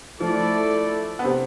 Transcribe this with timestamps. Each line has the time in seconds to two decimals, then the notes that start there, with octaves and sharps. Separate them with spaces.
0.20 F3 A3 E4 A4 D5
1.19 B3
1.24 C3 C4